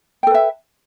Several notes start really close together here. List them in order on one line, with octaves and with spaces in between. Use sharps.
G5 A4 B4 E5